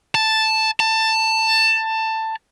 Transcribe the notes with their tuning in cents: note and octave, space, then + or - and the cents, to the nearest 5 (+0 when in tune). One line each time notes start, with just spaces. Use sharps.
A5 +0
A5 +15